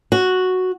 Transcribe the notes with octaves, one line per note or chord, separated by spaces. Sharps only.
F#4